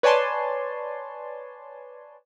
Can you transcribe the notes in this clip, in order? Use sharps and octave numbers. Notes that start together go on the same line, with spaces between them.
B4 C#5 D5 G#5 A5 C6